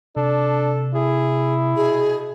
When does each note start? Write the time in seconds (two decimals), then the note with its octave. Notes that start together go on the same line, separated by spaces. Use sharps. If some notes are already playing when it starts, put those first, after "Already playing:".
0.16 C3 D4 A4
0.94 E4 G#4
1.76 B2 G#4